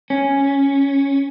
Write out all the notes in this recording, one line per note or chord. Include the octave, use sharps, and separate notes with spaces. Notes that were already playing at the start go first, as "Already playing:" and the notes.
C#4